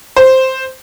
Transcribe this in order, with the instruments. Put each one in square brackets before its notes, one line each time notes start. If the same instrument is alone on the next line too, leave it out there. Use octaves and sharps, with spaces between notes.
[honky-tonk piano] C5